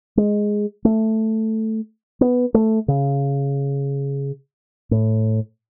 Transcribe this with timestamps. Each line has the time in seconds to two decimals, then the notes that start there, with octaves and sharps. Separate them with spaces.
0.17 G#3
0.85 A3
2.21 B3
2.54 A3
2.88 C#3
4.91 A2